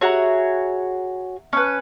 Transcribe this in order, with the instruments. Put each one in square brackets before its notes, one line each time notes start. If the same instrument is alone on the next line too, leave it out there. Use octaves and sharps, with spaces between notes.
[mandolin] F#4 G#4 C#5 [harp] E5 F#5 A#5
[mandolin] C#4 B4 [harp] C#6